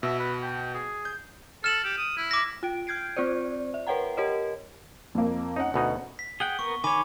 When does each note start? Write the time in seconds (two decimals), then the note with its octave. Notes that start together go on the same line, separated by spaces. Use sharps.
0.03 B2 E5
0.20 B4
0.43 G5
0.74 G#4
1.05 G6
1.64 A4 F6 E7 F#7
1.84 G4
1.98 D#6
2.17 E4
2.31 D6 A#6
2.63 F4 G5 D7
2.87 F6 G6 G#6 C7 D7
3.16 C4 F4 C5 D5
3.74 E5
3.87 A#4 B4 C#5 F#5 G5 A#5
4.17 G4 A#4 C#5 D#5
5.15 F2 A#3
5.56 C#4 D#4 F#5
5.74 D2 B2 D#4
6.19 B6
6.40 G#4 F#5 G5 G7
6.59 B3 A#4 C#6
6.84 D#3 C#5 G#5 B5 D6